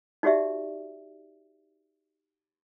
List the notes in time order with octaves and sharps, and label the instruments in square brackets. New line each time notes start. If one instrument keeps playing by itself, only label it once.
[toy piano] D#4 F#4 G4 D5 E5